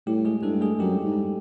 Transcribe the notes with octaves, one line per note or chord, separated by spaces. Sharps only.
A2 G3 G4
G#3 G#4
G2 A3 A4
G#3 G#4
F#2 G3 G4
G#2